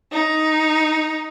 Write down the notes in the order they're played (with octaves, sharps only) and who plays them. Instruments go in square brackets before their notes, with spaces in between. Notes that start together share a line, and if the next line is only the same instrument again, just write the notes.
[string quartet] D#4